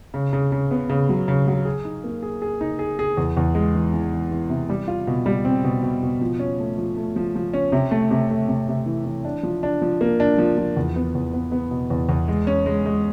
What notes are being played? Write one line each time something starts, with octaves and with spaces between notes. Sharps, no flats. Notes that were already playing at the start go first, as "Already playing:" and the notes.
C#3
C#3
C#3
B3
C#3
F#3
C#3
F#3
G#4
D#4
A#3
G#4
G#4
D#4
G#4
G#4
E2
E2
G#3
E3
E3
E3
E3
C3
G3
F4
B2
G3
C4
B2
B2
B2
F3
C#4
A3
F3
A3
F3
F3
C#4
C3
A3
C3
A3
C3
C3
E3
E3
D4
F3
D4
F3
A#3
D4
F3
F3
E2
B3
E2
B3
B3
B2
E2
E2
G#3
C#4
G#3
G#3